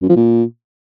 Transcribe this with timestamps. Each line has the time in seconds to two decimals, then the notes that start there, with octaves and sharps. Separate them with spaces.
0.02 F#2
0.09 F3
0.16 A#2